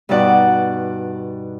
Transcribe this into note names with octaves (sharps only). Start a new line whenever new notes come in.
G2 B2 D#4 D5 F#5